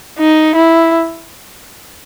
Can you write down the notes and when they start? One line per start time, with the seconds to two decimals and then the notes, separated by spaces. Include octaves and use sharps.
0.19 D#4
0.55 E4